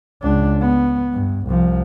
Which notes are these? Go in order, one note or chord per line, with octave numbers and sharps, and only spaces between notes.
C#2 D4
B3
G2
C2 F3